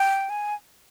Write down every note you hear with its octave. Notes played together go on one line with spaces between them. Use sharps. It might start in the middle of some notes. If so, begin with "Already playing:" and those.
Already playing: G5
G#5